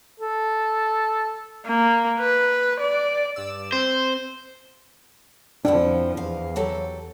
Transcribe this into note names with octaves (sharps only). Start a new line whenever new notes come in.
A4
A#3
B4
D5
G2 D5 E6
C4 C5
F2 F3 D4 E4 F#5 G5
E2 F5
F#3 G4 A4